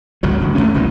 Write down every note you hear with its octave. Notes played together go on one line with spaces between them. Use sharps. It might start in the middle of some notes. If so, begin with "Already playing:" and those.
G1 C#2 A2 F#3
G1 D2
G#1 G2 A3 C#4
F#1 C#2 B2 E3